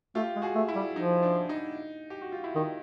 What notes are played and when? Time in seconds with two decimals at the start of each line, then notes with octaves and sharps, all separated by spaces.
0.15 A3 F4 G4
0.36 G#3
0.42 F#4 G#4
0.55 A3
0.68 E4 F#4
0.76 G3
0.96 F3 D#4
1.23 D4
1.49 D#4
2.10 G4
2.21 F#4
2.32 F4
2.44 E4
2.56 D#3 D#4